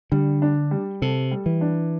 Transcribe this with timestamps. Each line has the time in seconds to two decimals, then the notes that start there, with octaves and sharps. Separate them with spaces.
0.12 D3 G3
0.42 D4
0.71 G3
1.02 C3 A4
1.31 G3
1.46 E3
1.61 D4